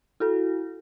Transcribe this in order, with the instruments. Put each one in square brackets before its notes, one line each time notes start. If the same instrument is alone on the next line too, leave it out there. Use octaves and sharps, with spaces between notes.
[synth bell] E4 F#4 A4